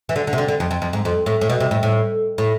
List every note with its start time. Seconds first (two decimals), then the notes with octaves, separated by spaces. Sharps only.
0.09 E3
0.16 D3
0.27 D3
0.33 C3
0.38 D3
0.48 D3
0.60 F2
0.71 F2
0.82 F2
0.93 G#2
1.05 F2
1.26 A2
1.41 A2
1.50 B2
1.60 C3
1.71 A2
1.83 A2
2.38 A2